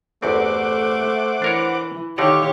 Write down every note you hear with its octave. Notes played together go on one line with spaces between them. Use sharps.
G1 E2 A3 C4 C5 F#5 D6
E3 D4 A#4 C#5
D3 D#3 D#4 G4 C#5 D5 F5